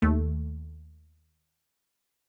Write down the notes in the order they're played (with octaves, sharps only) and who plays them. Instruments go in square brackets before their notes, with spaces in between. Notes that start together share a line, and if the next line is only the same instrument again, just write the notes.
[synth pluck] D#2 A3